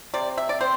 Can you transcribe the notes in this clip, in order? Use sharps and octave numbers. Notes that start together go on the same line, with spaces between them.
C3 D5
E5
D5
C4 C5